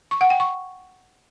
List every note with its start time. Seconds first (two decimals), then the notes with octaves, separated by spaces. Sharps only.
0.11 C#6
0.21 F#5
0.30 G5
0.40 C#6